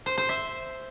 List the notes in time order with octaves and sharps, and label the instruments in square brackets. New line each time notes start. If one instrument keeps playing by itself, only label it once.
[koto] C5
C5
E5